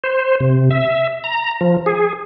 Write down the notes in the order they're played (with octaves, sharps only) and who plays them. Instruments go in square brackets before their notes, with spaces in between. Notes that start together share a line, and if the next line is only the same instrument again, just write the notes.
[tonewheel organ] C5
C3
E5
A#5
F3
G#4